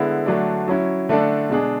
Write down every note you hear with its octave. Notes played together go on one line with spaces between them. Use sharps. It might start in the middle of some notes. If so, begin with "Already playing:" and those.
Already playing: D3 G#3 B3 E4
D3 F#3 A3 D4
F#3 C#4 E4
D3 A3 D4 A4 D5
B2 G#3 D4 G#4